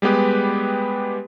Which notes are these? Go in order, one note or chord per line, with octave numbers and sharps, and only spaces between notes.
G3 G#3 B3 G4 B4